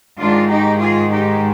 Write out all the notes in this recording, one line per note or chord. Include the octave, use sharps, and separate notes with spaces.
G#2 D#3 G#3 D4 F4
D#4 G4
F4 G#4
D#4 G4